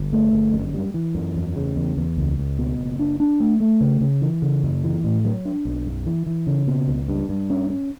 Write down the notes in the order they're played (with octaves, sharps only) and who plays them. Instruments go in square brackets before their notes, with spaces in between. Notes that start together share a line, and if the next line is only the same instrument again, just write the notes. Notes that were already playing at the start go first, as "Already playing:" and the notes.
Already playing: [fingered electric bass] G1
A3
G1
F#2
G3
E3
F#2
E2
C#3
E2
E2
C#2
C#2
B2
F#1
D4
D4
A3
A3
C#3
C#3
E3
C#3
F#2
E3
A2
F#3
D4
B1
F#2
E3
E3
C#3
B2
C#2
G2
G2
C#4
C#4